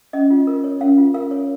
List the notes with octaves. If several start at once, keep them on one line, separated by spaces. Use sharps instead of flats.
C#4 D#5
F4
A#4
C#5
C#4 F5
F4
A#4 F5
C#5